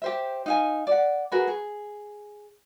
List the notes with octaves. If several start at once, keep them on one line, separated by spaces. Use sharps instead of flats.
G4 C5 E5
D#4 F5 G#5
D5 F#5
F#4 G#4 A#4 B4
G#4